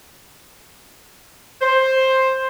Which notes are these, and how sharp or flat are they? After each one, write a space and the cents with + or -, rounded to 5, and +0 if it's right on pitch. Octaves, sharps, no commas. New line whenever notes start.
C5 +10